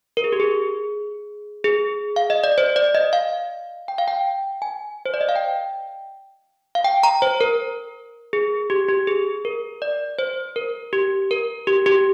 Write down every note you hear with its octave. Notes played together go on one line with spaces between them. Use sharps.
A#4
G#4
G4
G#4
G#4
F5
D#5
D5
C5
D5
D#5
F5
G5
F5
G5
G#5
C5
D5
D#5
F5
G5
F5
G5
A#5
C5
A#4
G#4
G4
G4
G#4
A#4
D5
C5
A#4
G4
A#4
G4
G4